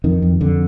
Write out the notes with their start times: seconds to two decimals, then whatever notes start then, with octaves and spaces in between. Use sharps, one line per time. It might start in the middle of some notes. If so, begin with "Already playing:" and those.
0.04 F2 D#3
0.22 F2
0.41 F2 D3